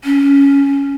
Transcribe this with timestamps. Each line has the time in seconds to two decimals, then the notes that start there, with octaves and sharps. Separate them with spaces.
0.04 C#4